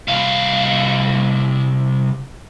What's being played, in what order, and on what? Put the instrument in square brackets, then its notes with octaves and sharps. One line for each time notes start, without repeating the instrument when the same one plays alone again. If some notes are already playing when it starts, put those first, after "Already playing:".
[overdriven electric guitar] C2 F5